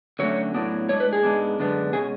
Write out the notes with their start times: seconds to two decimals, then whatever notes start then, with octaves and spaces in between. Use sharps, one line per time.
0.19 D3 F#3 A3 C#4 C#5
0.54 A2 F#3 B3 D4
0.89 A2 G#3 D4 C#5
1.00 B4
1.13 G#4
1.23 G#2 G#3 B3 D4
1.59 F#2 D3 G#3 B3 D4
1.93 B2 G#3 C#4 G#4